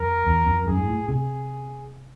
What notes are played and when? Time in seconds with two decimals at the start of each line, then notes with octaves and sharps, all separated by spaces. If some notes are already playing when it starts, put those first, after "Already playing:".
Already playing: F2 A#4
0.27 E2
0.47 F2
0.67 F#2 G#4
0.77 G#2
0.88 A2
1.08 C3 G#4